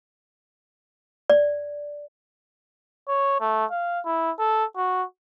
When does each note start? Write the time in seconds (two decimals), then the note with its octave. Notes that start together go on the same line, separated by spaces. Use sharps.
1.30 D5
3.08 C#5
3.40 A3
3.71 F5
4.05 E4
4.38 A4
4.77 F#4